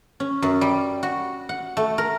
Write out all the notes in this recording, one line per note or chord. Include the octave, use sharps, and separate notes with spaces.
C#4
F#2
G3
F#4
F#5
A3
A#4